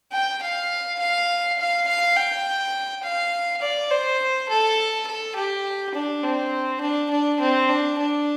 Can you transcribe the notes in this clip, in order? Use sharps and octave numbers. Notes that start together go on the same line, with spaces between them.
G5
F5
F5
F5
F5
G5
F5
D5
C5
A4
A4
G4
D4
C4
D4
D4
C4
D4
D4